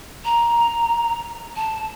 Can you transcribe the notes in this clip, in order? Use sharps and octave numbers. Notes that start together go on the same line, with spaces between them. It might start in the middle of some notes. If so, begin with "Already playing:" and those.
A#5
A5